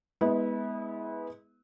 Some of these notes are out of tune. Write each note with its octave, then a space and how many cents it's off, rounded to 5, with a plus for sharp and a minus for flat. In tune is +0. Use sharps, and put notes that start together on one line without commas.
G#3 +0 B3 +0 E4 -30